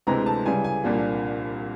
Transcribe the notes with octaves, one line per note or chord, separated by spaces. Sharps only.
D2 C3 E3 G#3 C4 A#5
A5
C#3 E3 G3 G#5
G#5
C2 A#2 F3 A#3 D4